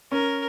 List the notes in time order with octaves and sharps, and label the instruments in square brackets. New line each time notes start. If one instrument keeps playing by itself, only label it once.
[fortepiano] C#4 [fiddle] A#4